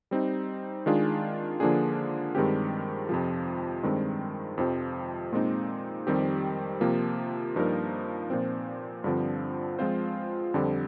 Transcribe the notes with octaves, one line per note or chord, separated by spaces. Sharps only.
G3 C4 D#4
D#3 G#3 D4 F4 G#4
D3 F3 A#3 D4 G#4
G2 D#3 G#3 C4 G4
F2 C3 F3
G2 D#3 G#3 C4
F2 C3 F3 C4
A#2 G#3 C4 D#4
F2 D#3 G3 C4 G4
C3 F3 A#3
G2 F3 A#3 D#4 A#4
A#2 F3 C4
G2 D3 F3 C4
F3 G#3 C4 F4 C5
F2 D3 G3 C4